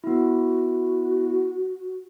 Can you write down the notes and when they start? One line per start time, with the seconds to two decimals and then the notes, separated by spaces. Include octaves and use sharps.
0.04 B3 E4 F#4